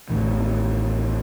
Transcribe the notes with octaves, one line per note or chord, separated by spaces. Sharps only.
A1 D#2 A2 D#3